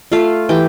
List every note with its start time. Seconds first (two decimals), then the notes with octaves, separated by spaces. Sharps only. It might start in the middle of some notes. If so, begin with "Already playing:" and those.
0.12 A3 F4 F5
0.49 E3 G4 G5